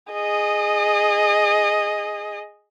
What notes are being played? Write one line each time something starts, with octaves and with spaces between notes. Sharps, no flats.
G#4 D#5